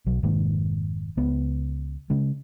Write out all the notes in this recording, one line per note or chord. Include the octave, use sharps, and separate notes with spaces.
B1 F#3
F1 G#2 D#3 A#3
C#2 B3
C#3 G#3